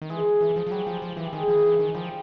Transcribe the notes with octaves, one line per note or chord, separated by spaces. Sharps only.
D#3
E3 G#3 G#4
E3
F3
F3
F#3 G3 G4
F3
F3
E3
G4
D#3 G#3 G#4
F3
D#3
E3
D#3
F3 G3 G4